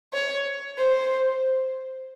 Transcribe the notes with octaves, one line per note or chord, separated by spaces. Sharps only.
C#5
C5